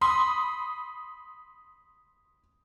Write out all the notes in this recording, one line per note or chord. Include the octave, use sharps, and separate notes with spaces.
B5 C6 D#6